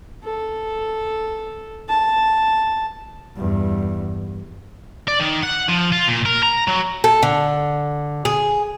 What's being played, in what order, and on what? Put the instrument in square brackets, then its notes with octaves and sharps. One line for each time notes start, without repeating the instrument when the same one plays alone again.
[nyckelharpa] A4
A5
[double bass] E2 G2
[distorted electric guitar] D5
D#3
F#5
F3
F4
A#2
A#4
A#5
F#3
[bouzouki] A4
D3
G#4